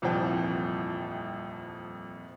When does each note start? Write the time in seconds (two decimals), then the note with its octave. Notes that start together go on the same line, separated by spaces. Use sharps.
0.02 D#1 C2 F2 E3 F3 G5